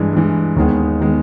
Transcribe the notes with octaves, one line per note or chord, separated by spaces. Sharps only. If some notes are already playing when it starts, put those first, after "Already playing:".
Already playing: G2 E3 G#3
G2 E3 G#3
D#2 D#3 G#3 B3
D#3 G#3 B3